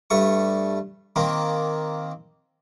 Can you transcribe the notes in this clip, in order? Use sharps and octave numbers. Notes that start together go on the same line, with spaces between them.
G2 A3 C#6
D#3 A#3 C4